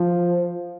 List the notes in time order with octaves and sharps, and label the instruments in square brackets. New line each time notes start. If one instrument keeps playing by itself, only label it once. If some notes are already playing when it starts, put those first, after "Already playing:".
Already playing: [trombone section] F3